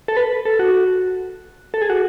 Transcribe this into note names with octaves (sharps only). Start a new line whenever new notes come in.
A4
B4
A4
F#4
A4
G#4
F#4